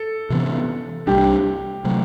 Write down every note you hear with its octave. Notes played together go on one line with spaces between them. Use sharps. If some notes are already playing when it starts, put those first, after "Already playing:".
Already playing: A4
C3 E3 B3
C2 C3 G3 D4 G4
C3 F#3 A3